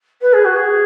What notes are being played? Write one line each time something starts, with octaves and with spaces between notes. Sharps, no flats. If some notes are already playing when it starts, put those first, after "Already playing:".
B4
G#4
F#4
G#4